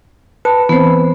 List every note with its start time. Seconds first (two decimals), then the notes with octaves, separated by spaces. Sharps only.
0.45 B4 A5
0.69 E3 B3 C4 C5